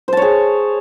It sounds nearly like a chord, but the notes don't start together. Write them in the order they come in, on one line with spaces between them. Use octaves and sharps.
C5 A5 C#5 G#4